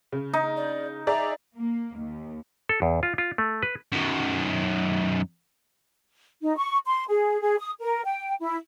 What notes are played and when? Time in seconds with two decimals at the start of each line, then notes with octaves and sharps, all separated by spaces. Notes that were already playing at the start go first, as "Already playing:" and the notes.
0.12 C#3
0.34 D#4
0.57 D5
1.07 G#4 D5 E5 A#5
1.57 A#3
1.98 D#2
2.69 A4
2.82 E2
3.03 F4
3.18 F4
3.38 A3
3.63 B4
3.92 F#2 D#3
6.41 D#4
6.57 C#6
6.86 C6
7.08 G#4
7.41 G#4
7.59 D#6
7.80 A#4
8.05 G5
8.40 E4